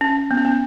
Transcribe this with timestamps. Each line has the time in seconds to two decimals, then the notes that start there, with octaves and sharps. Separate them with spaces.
0.01 C#4
0.31 B3
0.37 C#4
0.45 B3